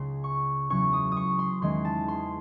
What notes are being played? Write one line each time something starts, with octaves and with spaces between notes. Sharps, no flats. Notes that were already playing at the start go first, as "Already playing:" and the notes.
Already playing: C#2 C#3 G#3 C6
C#6
E2 C#3 F#3 C#4 C#6
D#6
D#6
C#6
C6
E2 D#3 G#3 C#4 C6
A5
C6